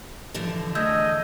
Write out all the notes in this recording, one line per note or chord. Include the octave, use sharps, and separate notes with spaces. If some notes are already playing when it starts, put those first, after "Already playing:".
D3 E3 F3
E2 D3 A3 D#5 E6 G6 G#6